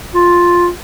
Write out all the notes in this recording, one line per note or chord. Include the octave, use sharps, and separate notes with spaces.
F4